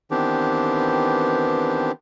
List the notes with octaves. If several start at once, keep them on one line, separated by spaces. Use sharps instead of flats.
D#3 E3 B3 C4 D4 G4